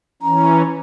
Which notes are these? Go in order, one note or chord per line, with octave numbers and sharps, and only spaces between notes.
E3 C#4 A#5